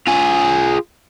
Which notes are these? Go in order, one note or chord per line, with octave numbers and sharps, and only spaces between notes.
F4 G#4